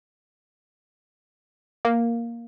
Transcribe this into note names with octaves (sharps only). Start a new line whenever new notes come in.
A#3